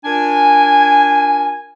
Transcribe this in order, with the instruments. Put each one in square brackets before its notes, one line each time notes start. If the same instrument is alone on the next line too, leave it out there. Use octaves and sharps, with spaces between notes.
[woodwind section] D4 F4 A#4 G#5